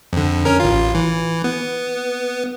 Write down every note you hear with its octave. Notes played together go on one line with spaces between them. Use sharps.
F2 D3
C#4 A#4
A1 F4
E3
B3